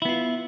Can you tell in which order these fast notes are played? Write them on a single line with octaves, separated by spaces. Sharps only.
E4 B3 F4